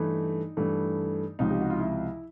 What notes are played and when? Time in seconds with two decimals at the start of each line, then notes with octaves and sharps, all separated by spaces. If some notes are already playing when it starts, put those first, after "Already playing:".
Already playing: G2 E3 A3 D#4
0.57 G2 E3 A3
1.39 C#2 C3 F3 D#4
1.51 G4
1.61 F#4
1.70 F4
1.80 E4